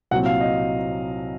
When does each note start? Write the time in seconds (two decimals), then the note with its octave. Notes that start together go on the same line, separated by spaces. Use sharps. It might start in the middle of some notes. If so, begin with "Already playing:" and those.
0.11 C2 A#2 F#3 C4 F#5
0.26 F5
0.40 D#5